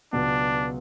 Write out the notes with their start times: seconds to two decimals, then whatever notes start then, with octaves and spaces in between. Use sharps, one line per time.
0.13 C#2 B2 F#3 B3 D4 F#4